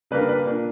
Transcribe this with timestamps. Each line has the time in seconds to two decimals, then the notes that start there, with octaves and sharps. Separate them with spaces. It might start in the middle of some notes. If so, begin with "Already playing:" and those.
0.11 C#3 G3 A#3 D4 B4
0.29 B4
0.45 A#2 A#3 D4